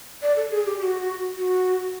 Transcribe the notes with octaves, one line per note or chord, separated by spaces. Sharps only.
D5
A4
G#4
G4
G4
F#4
F#4